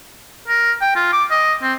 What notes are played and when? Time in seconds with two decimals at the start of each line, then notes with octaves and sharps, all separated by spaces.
0.48 A#4
0.81 G5
0.95 F4
1.13 D6
1.30 D#5
1.62 C4